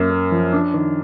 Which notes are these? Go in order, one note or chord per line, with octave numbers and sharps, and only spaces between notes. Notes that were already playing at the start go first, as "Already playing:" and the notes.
Already playing: F#2 A#3
A#3
F3
D4
D#3